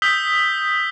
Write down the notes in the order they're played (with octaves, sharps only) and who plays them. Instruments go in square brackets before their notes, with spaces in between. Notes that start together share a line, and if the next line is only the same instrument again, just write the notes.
[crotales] D#6 E6 G6 B6 G7